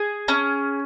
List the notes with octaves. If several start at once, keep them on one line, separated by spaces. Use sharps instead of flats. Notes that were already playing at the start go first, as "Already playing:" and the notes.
Already playing: G#4
C#4